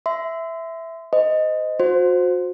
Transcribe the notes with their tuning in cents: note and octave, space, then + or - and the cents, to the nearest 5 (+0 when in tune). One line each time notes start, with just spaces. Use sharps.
E5 +0 C6 -35
C5 -35 D#5 +0
F#4 -35 C5 +0